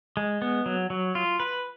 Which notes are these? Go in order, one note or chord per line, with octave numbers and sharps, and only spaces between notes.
G#3
B3
F#3
F#3
F4
B4